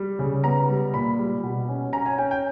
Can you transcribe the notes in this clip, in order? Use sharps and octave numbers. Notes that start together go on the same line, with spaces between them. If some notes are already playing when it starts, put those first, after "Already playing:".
Already playing: G3
C#3
B3 A#5
G3
A#2 B5
G3
B2
C#4
C#4 A#5
G#5
C#4 G5
G5